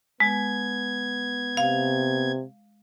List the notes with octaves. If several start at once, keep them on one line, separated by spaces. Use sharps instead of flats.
G#3 B3 G#6
C3 F5